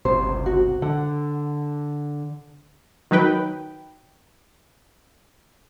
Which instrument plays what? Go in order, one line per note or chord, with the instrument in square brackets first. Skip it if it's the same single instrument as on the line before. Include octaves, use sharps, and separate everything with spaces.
[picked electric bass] G1 C#2 C3 [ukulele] C5
[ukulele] F#4
[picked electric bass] D3 [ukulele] F#5
[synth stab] D#3 F#3 D#4 B4 G5